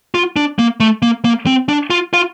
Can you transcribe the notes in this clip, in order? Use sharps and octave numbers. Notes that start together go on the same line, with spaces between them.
F4
D4
A#3
A3
A#3
A#3
C4
D4
F4
F4